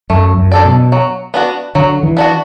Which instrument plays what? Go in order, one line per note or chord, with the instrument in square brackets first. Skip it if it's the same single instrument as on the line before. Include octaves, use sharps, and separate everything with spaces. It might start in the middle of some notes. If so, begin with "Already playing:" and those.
[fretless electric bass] F#2 [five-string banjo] A3
[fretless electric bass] F#2
[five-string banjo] D4 A4 D5
[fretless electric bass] B2
[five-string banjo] F#3
B3 D4 F#4
[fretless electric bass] D3 [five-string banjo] F#3
[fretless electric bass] E3
[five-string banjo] B3 D4 F#4